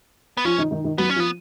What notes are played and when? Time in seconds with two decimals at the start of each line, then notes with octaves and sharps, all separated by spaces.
0.37 B3
0.45 F3 C#4 F4
0.58 D#3 D#4
0.71 D#3 D#4
0.84 D#3 D#4
0.97 F#3 B3 F#4
1.10 C#4
1.16 F3 F4
1.20 B3